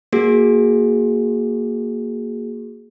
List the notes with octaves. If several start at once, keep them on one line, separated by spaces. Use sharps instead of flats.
A#3 F#4 G#4